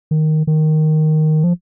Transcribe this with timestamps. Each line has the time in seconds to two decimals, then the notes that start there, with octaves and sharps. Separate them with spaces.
0.11 D#3
0.47 D#3
1.44 F3